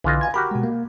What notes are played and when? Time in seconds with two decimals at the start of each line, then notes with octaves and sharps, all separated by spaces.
0.04 B1 D3 E3 F4 D#5
0.21 F5 G#5 G#6
0.34 F#4 G4 A#4 B5
0.51 B2 G#3
0.63 A#3